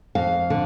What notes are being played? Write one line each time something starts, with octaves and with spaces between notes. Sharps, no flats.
F2 F5
D3